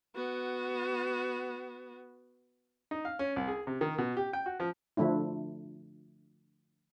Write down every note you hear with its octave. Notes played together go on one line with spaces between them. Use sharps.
B3 F#4
D#4
F5
C#4
C2
G#4
C3
D#3
B2
G4
G5
F#4
F3
D3 F3 A3 D4 E4